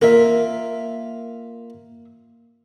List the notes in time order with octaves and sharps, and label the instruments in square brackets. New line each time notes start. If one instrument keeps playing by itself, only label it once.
[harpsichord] A#3 F4 [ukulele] A#4 E5